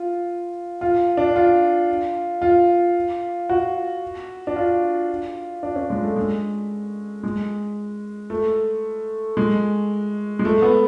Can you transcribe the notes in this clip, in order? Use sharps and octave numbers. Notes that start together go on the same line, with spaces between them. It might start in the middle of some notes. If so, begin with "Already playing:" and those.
Already playing: F4
F4
D4
F4
F4
F#4
D4
F4
D4
C#4
G#3
A3
G#3
G#3
A3
G#3
G#3
A3
B3